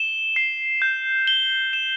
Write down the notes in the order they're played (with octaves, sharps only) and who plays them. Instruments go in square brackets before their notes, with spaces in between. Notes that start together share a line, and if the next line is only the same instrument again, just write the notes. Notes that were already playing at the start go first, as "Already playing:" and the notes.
Already playing: [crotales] E7 G7
C7
G6
G7
E7